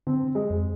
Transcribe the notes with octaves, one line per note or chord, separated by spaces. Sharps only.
D3 C4
G#3
F2